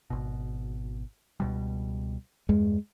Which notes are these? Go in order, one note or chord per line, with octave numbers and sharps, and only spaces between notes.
G#1 B2
C#2 B2 G3
E2 G2 G#3